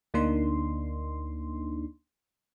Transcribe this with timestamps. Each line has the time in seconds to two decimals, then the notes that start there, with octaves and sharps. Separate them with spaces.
0.14 D2 A#3 D4 D#4 C6